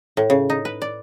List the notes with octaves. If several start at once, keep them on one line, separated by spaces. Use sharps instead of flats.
A2
C#3
D#4
B4
D5